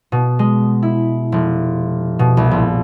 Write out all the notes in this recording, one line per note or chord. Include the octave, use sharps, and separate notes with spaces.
B2
G#3
E4
F1
B2
C2
A#1